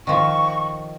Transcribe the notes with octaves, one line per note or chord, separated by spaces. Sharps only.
D#3 F3 C#6